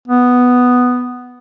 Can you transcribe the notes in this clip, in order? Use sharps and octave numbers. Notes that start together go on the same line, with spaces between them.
B3